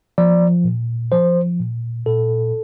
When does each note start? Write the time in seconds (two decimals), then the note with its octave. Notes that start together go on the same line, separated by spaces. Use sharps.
0.18 F3 D5
0.64 A#2
1.12 F3 C5
1.59 A#2
2.06 A#2 A4